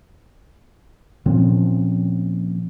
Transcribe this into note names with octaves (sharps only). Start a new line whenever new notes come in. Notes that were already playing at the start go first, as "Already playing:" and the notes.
A#2 F3 C4 C#4